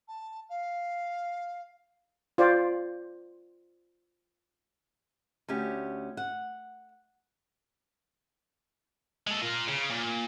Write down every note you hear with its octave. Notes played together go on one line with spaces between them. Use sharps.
A5
F5
F4 C5 D5
D2 C#4 G4
F#5
G#3 A4
F4 A#4
C#3
A#2